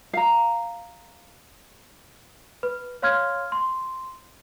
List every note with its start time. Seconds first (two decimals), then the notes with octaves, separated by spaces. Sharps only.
0.13 F5 A#5
2.63 B4
3.02 C#5 F5 C6 F6 G#6
3.52 C6